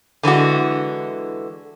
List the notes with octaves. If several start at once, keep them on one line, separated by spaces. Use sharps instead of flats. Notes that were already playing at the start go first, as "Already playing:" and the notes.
D3 E3 G#3 F#4